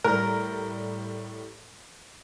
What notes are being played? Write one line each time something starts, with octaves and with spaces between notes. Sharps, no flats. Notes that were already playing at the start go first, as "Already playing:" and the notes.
A2 G3 A#4